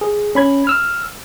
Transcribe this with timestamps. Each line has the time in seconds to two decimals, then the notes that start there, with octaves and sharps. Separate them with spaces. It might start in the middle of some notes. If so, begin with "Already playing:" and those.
0.01 G#4
0.35 C#4 B5 G#6
0.67 E6 F6